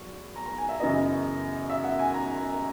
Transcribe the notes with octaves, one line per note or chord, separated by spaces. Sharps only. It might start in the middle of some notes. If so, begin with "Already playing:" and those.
Already playing: E2 F#3 C#6
A#5
A#5
G#5
E5
F#2 C#3 E3 B3 D#5
E5
F#5
G#5
A#5
A#5